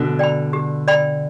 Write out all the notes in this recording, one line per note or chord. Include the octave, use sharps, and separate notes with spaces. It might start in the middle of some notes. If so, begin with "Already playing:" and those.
Already playing: B2 D3
D5 G5 B5
G4
D5 G5 B5